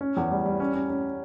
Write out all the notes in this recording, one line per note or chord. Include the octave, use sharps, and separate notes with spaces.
C#4
E2
G3
G3
C#4
C#4
C#4